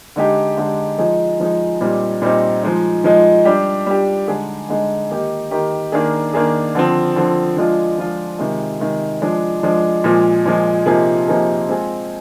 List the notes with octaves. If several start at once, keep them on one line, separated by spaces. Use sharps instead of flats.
D3 G#3 D#4 G4
D3 G#3 D#4 G4
F3 G#3 D#4 G#4
F3 G#3 D#4 G#4
A#2 G3 C4 D#4
A#2 G3 C4 D#4
F3 G#3 D#4
F3 G#3 D#4
G3 D4 G4
G3 D4 G4
D3 G#3 D#4 G#4
D3 G#3 D#4 G#4
D#3 A#3 D#4 G4
D#3 A#3 D#4 G4
D#3 A#3 D4 G#4
D#3 A#3 D4 G#4
D3 F3 C4
D3 F3 C4
F3 G#3 D4 F4
F3 G#3 D4 F4
C3 D#3 G#3
C3 D#3 G#3
F3 G#3 D4
F3 G#3 D4
A#2 F3 G#3
A#2 F3 G#3
C3 F3 A#3 D#4 G#4
C3 F3 A#3 D#4 G#4
G#3 C4 F4 G#4